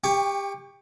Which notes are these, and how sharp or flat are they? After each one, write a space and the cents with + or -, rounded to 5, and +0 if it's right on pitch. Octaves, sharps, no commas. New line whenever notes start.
G4 +20 G5 +45 C#6 +10